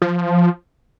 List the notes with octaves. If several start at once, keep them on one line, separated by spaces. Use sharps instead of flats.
F3